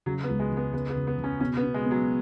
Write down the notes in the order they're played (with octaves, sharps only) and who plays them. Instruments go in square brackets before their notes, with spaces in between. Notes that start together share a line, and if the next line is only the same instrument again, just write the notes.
[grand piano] C#3 [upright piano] F#3
[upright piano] B3
[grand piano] C#2
[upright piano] G#3
[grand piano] C#3
[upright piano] B3
[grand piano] C#3 [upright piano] B3
[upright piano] B3
[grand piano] C#3
[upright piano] B3
[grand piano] C#3
[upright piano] C#4
[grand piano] B2 [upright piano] C#4
[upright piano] B3
[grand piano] B2
[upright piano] G#3
[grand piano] B3
[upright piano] F#3